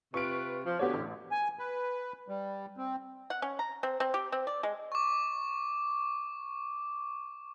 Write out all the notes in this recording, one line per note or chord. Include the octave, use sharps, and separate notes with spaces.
C3 F4 B4 C#6 D7
F3
D3 B3 D4 F#4 G4 C#5
A1
G#5
B4
G3
C4
F#5
C#4
A#5
C4
C4
G4
C4
D5
G#3
C#6 D6